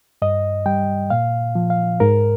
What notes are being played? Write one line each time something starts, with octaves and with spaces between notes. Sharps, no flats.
G2 D#5
G3 G5
A#2 F5
F3
F5
G#2 A#4